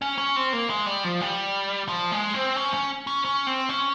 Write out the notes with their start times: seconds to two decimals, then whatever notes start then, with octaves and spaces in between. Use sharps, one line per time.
0.02 C#4
0.18 C#4
0.36 C4
0.53 A#3
0.70 G#3
0.86 G3
1.04 F3
1.21 G3
1.88 F3
2.12 G#3
2.34 C4
2.56 C#4
2.74 C#4
3.07 C#4
3.25 C#4
3.47 C4
3.69 C#4